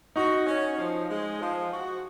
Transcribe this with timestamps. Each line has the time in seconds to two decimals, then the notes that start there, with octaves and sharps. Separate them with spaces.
0.15 D#4 F#4
0.46 C#4
0.78 F3
1.09 G#3
1.39 F3
1.71 F#4